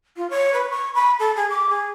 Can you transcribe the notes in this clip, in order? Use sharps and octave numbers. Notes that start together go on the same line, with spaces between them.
F4
C#5
B4
C#6
B5
A4
G#4
D6
G#4